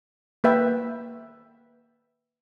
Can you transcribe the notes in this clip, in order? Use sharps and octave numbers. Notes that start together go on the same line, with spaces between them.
A#3 B4 E5 G5